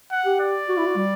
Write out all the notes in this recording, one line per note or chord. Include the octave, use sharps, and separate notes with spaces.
F#5
G4
D5
F#4
E4
F#4
G3